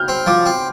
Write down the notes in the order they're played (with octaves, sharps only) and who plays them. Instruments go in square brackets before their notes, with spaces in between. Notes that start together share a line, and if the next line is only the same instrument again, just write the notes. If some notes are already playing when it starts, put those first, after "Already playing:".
Already playing: [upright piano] F6 G6
[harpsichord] C4
[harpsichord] F3 [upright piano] D6
[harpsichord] C4